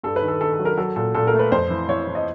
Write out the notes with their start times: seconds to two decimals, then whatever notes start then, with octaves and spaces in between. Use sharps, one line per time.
0.03 G2 A4
0.16 B4
0.22 D#3
0.28 A4
0.41 D#3 A4
0.53 A4
0.59 F#3
0.65 A#4
0.77 F#3 A4
0.96 A#2 A4
1.15 A#2 A4
1.27 A#4
1.34 A3
1.39 B4
1.52 F2 C5
1.70 E3
1.89 E3 C#5
2.07 E3
2.15 D#5